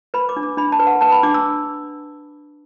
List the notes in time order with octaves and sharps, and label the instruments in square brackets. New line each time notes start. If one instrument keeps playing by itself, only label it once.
[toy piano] B4 B5
D6
D4
D6
D4 B5
A5
B4
F#5
B4 A5
B5
D4 D6
E6